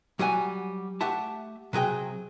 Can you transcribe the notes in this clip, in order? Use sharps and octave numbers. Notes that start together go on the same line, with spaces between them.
F#3 G3 F#5 G#5
A3 G4 E5 F#5 A5
C3 F#3 G#4 G5